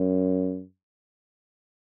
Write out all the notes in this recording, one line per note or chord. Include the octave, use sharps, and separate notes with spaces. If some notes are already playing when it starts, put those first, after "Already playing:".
Already playing: F#2